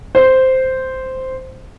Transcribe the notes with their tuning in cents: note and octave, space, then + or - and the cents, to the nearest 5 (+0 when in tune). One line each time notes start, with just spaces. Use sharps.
C5 -5